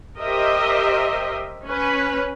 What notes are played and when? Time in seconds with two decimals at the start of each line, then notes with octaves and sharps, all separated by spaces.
0.19 G4 A#4 C5 D#5 E5
1.66 C#4 B4